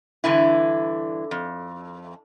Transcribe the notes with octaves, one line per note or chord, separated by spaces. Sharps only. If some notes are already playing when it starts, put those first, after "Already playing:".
G2 D3 E3 E4
F2